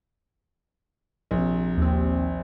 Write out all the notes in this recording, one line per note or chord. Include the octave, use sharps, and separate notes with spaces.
A#1 C3
D#2 C4